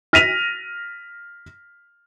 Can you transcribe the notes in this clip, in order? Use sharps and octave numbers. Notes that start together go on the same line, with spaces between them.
F6 A#6 B6 D#7 F7